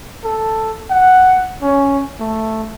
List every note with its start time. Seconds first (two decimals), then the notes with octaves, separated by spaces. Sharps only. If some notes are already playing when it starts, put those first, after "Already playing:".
0.24 A4
0.91 F#5
1.62 C#4
2.20 A3